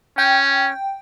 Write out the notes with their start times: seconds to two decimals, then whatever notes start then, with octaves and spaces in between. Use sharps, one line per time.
0.18 C#4 G5